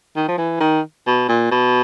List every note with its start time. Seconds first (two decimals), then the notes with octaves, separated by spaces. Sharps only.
0.16 D#3
0.28 F3
0.38 E3
0.60 D#3
1.06 B2
1.29 A#2
1.51 B2